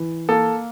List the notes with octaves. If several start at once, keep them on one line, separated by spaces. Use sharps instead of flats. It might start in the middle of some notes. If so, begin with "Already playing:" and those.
Already playing: E3
A#3 A4